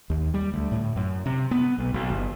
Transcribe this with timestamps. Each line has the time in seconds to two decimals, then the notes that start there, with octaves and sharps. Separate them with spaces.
0.10 D#2
0.34 G3
0.54 D2
0.72 A2
0.96 F#2
1.26 C3
1.51 B3
1.78 B1
1.94 B1
2.10 G1